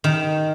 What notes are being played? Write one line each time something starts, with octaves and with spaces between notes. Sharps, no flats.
D#3